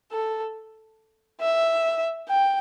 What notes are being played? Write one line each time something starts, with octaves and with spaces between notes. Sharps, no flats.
A4
E5
G5